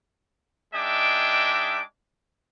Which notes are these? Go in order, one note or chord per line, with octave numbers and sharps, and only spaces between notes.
G#3 D4 D#4 E5 G5 D6